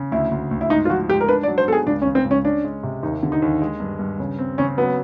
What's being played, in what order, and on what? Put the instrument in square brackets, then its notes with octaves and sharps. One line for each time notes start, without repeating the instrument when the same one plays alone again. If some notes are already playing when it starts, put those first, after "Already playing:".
Already playing: [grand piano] C#3
[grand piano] D2 [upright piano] E4
[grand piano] D2
D2
[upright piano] E4
[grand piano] G#2 [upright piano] D#4
[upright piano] F4
[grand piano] F3 [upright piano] F#4
[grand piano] G#2 [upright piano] G4
[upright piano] A#4
[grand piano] D4 [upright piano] B4
[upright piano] D5
[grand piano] F#3
[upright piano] C5
[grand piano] B3 [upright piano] A4
[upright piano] G#4
[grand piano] C#2 [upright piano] D4
[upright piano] C#4
[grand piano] C#3
[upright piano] C4
[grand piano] C#2
[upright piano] C#4
[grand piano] C#4 [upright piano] D4
[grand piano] G#3
C3
[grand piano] D#2 [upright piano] D#4
[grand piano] D3
[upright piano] D#4
[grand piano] D#2
G#3
G2
G2
C#3
C4
[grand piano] C#3 [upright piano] C#4
[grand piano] F#3 [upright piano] B3